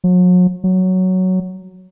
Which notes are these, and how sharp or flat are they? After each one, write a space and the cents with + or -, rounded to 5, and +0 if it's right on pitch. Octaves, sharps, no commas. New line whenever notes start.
F#3 -40
F#3 +5